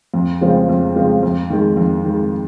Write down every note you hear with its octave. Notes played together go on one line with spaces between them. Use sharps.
F2
C#3 F3 G#3 C4
F2
C#3 F3 G#3 C4
F2
D#3 G#3
F2
D#3 G#3